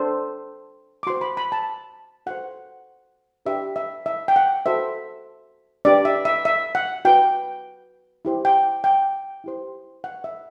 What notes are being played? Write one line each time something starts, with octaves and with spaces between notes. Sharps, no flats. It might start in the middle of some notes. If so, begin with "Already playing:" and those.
Already playing: D4 A4 C5
D6
F#4 C5 C6
B5
B5
A5
F#4 A4 C5 F#5
D4 G4 B4 E5
E5
E5
G5
F#5
F#4 A4 C5 E5
D4 G4 B4 D5
E5
E5
E5
F#5
F#4 B4 G5
E4 G4 C5
G5
G5
E4 G4 C5
F#5
E5